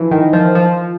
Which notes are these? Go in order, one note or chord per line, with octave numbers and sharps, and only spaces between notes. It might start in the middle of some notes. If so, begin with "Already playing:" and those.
Already playing: E3 F3
D#3
F3
F3